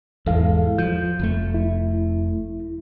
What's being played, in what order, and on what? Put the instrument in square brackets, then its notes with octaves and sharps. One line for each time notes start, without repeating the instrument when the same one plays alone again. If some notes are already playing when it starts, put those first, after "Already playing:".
[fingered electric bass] E2 G#2 [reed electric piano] E4 A4 F5
[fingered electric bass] F3 [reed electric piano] G6
[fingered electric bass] F1 A3
[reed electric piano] E4